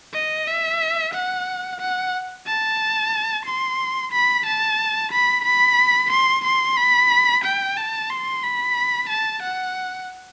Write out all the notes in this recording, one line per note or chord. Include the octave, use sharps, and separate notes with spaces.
D#5
E5
F#5
F#5
A5
C6
B5
A5
B5
B5
C6
C6
B5
G5
A5
C6
B5
A5
F#5